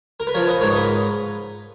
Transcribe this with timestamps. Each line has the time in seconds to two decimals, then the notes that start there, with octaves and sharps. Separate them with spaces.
0.20 A#4
0.27 B4
0.34 F3 A#4 C#5
0.47 B4 D#5
0.61 G#2 A#4 C#5
0.75 B4 D#5